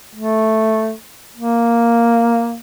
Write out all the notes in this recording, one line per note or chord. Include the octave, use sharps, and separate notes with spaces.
A3
A#3